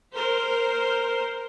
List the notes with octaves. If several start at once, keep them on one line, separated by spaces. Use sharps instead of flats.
A#4 C5